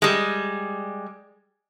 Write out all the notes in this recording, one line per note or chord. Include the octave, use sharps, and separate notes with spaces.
G3 G#3